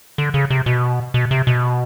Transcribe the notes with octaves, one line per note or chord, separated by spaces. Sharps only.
D3
C#3
C3
B2
B2
C3
B2